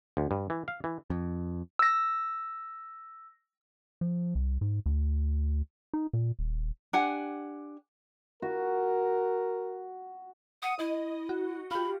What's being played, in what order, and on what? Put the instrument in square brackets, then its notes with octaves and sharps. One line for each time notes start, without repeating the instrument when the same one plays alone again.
[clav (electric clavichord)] D2
G2
E3
F5
E3
[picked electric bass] F2
[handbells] E6 A#6
[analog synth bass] F3
C2
G#2
D2
D#4
A#2
D#1
[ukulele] D4 G4 F#5 G#5
[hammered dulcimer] F#4 [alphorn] A#4
[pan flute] F#5 [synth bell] D#6 D#7
[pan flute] E4 [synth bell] D#5
[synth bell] F#4
[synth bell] F4 G4 [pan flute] B5